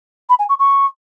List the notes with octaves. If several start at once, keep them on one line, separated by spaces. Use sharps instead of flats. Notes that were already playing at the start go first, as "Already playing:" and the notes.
B5
G#5
C#6
C#6